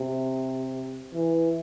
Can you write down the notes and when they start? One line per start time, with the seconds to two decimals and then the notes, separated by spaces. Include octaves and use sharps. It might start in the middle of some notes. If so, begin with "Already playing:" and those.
Already playing: C3
1.14 E3